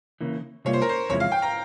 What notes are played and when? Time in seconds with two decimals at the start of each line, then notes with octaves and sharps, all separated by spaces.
0.21 C#3 E3 A#3
0.65 C3 G3 A#3 F4 C#5
0.73 C5
0.82 A#4
0.89 C5
1.09 E2 C3 F3 G#3 E4 C#5
1.20 F5
1.32 G5
1.42 A#5